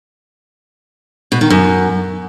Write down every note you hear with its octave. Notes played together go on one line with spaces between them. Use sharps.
B2
D#3
F#2